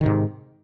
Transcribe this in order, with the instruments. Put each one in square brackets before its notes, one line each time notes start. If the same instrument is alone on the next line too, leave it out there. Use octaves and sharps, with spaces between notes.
[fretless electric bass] D#3
C3
G#2